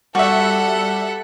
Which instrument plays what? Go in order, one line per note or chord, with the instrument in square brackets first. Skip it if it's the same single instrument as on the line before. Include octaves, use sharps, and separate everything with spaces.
[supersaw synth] G3 E5 [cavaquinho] F#4 [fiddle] A4 F#5